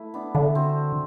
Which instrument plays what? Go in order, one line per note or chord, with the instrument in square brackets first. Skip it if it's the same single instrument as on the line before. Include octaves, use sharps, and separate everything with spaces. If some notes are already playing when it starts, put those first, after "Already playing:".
Already playing: [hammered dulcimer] A3 E4 B4
B3 D4
[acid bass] D3 [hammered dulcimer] A3
[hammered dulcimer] C4 F#4